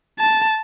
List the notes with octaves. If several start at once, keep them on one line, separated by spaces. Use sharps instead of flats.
A5